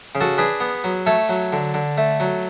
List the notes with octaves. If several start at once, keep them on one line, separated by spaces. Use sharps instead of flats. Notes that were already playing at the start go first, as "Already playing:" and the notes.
C#3
F#4 A4
D4 G#4 B4
B3
F#3
A3 A4 C#5
F#3
D3
D3
A3
F#3